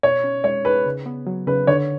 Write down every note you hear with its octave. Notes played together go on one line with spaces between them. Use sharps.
B2 C#5
C#4
G#3 C#5
G#4 B4
C#3
B3
F#3
C#3 B4
D3 C#5